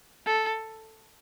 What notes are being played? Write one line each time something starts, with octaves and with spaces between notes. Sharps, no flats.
A4